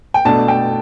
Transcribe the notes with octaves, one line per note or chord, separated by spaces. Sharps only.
G5
B2 A3 D4 A5
G5